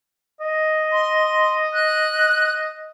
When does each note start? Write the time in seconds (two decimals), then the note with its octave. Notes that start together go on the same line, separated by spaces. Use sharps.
0.41 D#5
0.92 C6
1.74 F#6